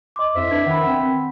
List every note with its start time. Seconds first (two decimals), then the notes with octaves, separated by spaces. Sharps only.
0.16 D#5 C6 D6
0.35 F2 E4 C5 E5
0.51 D4 B4 G#6
0.66 D#3 F#5 B5
0.86 C4